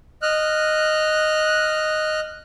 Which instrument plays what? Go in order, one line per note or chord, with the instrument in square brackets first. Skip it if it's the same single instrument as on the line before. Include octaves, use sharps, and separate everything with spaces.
[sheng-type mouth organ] D#5 F6 F#6